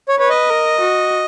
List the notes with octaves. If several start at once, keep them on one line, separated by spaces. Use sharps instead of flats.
C#5
B4 C#5
D#5
A#4
F#4